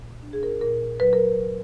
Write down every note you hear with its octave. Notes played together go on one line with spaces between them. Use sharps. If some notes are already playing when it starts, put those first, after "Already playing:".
Already playing: A#2
D4
G#4
A#4
A#2 A#4
F#3 B4
A#4